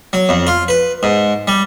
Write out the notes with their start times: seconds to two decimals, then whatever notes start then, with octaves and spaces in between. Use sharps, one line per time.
0.13 F#3
0.29 F2
0.47 F4
0.68 B4
1.03 G#2
1.47 G3